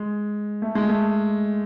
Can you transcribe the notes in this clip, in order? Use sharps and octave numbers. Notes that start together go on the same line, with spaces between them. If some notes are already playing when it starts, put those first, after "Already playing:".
Already playing: G#3
A3
G#3
A3